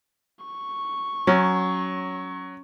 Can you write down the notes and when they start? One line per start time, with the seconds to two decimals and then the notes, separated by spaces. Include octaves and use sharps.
0.45 C#6
1.27 F#3 C#4